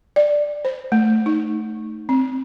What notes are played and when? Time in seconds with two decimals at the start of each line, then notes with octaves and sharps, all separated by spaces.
0.16 D5
0.65 C5
0.92 A3
1.26 D#4
2.09 C4